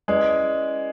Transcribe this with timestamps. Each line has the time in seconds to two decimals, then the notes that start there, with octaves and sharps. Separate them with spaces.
0.08 G#3 C#4 E4 B4 D5